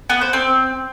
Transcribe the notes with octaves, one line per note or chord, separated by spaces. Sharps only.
B3
C5
C4